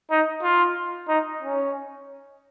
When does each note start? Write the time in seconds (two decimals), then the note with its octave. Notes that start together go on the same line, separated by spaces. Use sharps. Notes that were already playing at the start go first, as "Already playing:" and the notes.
0.11 D#4
0.43 F4
1.08 D#4
1.42 C#4